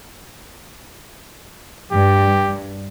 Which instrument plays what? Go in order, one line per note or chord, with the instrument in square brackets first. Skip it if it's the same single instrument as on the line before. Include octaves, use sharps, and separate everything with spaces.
[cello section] G2 [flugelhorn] G4